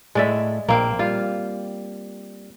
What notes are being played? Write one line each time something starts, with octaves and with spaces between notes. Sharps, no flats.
A2 G#3 D5 E5
A#1 A#3 C4
G3 F4